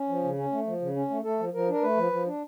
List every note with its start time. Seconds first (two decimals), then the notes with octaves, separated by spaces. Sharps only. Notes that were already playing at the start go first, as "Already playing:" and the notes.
Already playing: C#4
0.09 F3
0.24 C#3
0.38 C#4
0.52 A3
0.67 F3
0.81 C#3
0.96 C#4
1.10 A3
1.25 A3 A4
1.40 F3
1.53 F3 A#4
1.69 D4 A#4
1.83 A3 B4
1.97 F3
2.12 F3
2.26 D4